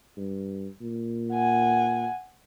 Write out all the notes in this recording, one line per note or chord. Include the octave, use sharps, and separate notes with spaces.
G2
A#2
F#5 G#5